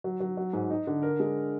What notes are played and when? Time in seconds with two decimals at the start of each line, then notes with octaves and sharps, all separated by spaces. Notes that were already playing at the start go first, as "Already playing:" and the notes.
0.04 F#3
0.20 F#3
0.37 F#3
0.53 G#2
0.70 D#4
0.87 D3
1.02 A#4
1.20 G#3